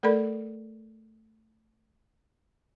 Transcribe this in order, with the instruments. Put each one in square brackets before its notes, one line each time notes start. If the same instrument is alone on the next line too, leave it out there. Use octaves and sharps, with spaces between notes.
[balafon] A3 A4 A#4 D5 B5